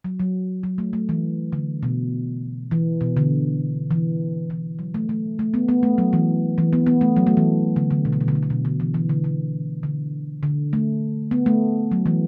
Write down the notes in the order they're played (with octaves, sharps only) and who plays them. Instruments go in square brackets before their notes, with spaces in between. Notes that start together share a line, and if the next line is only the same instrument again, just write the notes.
[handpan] F#3
F#3
F#3
A3
A3
E3
D3
B2
E3
B2
D3
E3
E3
F#3
A3
A3
A3
B3
B3
A3
F#3
E3
E3
B3
B3
A3
F#3
A3
E3
D3
D3
B2
D3
B2
D3
B2
D3
B2
D3
E3
E3
D3
D3
D3
D3
A3
B3
A3
F#3
E3